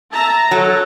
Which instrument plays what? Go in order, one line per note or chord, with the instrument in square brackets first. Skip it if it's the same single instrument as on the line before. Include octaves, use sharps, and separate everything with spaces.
[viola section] E5 A5 A#5
[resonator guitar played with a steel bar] F#3 [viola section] A4 C#5